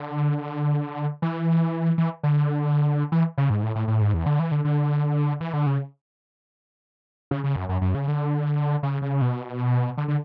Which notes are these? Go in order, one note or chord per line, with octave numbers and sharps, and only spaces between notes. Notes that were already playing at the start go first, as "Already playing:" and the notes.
Already playing: D3
E3
E3
D3
E3
C#3
G#2
A2
A2
A2
G#2
E2
D3
E3
D3
D3
E3
D3
C#3
C#3
C#3
F#2
F#2
F#2
C#3
D3
C#3
C#3
B2
D3
D3